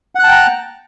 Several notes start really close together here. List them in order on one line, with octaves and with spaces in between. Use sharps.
F#5 F#6 A5 G5 A#5